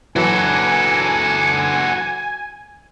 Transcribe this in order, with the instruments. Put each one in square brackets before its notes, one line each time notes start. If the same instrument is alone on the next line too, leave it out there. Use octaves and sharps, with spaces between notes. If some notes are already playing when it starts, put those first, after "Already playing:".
[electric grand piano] E3 F#3 [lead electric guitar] F#4 A4 [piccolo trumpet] G#5